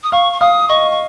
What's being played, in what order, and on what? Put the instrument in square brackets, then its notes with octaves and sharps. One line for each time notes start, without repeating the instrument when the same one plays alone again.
[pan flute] D#6
[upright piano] F5 [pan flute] C#6
[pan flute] C#6
[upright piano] F5 [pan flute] D#6
[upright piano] D#5 [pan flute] C#6
[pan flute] C#6